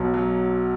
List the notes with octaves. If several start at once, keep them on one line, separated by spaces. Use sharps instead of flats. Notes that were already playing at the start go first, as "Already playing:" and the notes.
Already playing: B1 B2
F#3